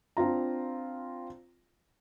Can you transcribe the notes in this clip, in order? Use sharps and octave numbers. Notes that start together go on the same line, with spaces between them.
C4 D4 F4 A#5